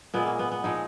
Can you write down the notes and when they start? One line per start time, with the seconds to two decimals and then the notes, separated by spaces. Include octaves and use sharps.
0.14 A#2 G#3 B3
0.26 A#3
0.39 B3
0.52 B3
0.64 A#2 F3 G#3 D#4